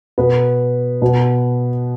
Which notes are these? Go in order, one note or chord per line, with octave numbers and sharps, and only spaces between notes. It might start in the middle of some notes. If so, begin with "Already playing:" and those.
B2 B3 B4
B2